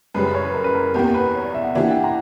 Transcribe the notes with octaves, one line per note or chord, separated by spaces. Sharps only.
F#2 C#3 G3 C#4 G4 B4
C#5
B4
A#4
B4
A#4
E2 B2 A#3 G4
B4
C#5
D5
E5
F#5
E3 A#3 D4 G4 E5
F#5
G5
F#5
G5
A#5